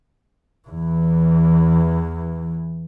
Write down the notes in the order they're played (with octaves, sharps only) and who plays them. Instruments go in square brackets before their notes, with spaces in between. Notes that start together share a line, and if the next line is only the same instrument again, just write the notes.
[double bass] E2 E3